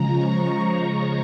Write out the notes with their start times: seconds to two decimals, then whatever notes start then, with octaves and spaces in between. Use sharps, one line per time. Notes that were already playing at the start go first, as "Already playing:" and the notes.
Already playing: C#3 F3 G#3 A#5
0.10 C#6